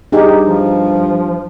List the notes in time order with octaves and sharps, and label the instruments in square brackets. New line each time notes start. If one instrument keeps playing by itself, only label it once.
[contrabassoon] G2 [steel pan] D#4 G4 G#4
[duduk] F3